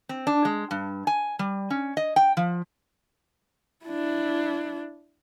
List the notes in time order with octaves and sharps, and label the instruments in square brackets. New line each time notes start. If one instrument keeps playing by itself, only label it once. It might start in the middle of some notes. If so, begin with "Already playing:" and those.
[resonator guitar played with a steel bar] C4
D4
G#3
G2
G#5
G3
C#4
D#5
G5
F3
[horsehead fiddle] D4 E4